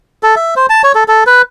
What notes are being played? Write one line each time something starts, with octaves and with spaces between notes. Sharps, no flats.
A4
E5
C5
A5
C#5
A4
A4
B4